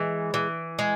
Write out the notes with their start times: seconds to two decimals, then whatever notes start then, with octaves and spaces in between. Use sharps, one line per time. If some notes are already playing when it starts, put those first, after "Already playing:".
Already playing: E3 G#3
0.34 E3
0.79 G#3